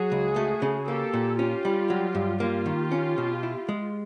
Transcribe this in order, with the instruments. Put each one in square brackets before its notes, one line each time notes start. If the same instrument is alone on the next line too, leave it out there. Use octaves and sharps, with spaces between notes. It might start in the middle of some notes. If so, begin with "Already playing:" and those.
Already playing: [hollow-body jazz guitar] F#3 [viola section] F#4 G#4
[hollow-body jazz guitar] C#2
A3
C#3
[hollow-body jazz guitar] A#3 [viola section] G4 A4
[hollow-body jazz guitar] A#2
[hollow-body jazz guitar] C#4 [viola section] F4 G4
[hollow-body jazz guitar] G3
F#3
G2
[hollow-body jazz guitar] A#3 [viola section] F4 G4
[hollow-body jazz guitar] D#3
C#4
B2
E4
G#3